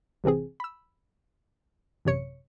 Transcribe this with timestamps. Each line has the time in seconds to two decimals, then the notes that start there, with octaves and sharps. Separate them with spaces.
0.24 A1 C3 E3 C4 G#4
0.60 B5 E6
2.05 A1 F#2 C3 C#5 C#7